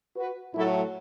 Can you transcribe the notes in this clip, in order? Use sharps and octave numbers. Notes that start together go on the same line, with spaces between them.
F#4 B4
A2 F#3 A3 E4 A4